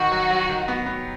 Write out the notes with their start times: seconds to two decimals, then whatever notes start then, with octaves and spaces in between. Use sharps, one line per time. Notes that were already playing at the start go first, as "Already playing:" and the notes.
Already playing: D#3 F#4
0.12 F#3
0.30 F#3
0.49 D#3
0.68 B3
0.86 B3